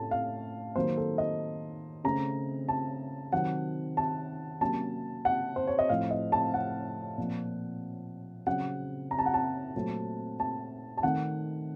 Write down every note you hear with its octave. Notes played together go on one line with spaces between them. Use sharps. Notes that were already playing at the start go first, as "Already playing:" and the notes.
Already playing: A2 A3 C#4 A5
F5
D#3 F#3 A#3 C5
A4
D#5
C#3 A3 C4 A#5
A5
C3 D#3 F#3 C4 F#5
A5
C3 F#3 A#3 C#4 A5
F#5
C5
C#5
D#5
A2 F3 C4 F5
D#5
A5
F#5
A#2 F3 C4
C#3 F#3 C4 F#5
A#5
A5
F#5
A5
A#2 F#3 A3 C4
A5
A5
D#3 A3 C4 F#5